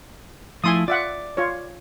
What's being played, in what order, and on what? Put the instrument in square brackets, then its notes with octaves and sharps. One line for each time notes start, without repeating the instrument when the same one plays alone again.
[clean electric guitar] F3 A3 E4 [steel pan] G#5 C6 D#6
[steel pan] F4 E5 F#5 [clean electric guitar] D5
[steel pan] F4 C#5